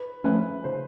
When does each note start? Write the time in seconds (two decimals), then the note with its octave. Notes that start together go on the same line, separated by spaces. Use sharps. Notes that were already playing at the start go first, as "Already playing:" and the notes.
Already playing: B4
0.24 F3 A3 C#4 B4
0.64 C#3 C5